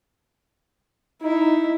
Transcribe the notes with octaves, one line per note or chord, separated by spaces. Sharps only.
D#4 E4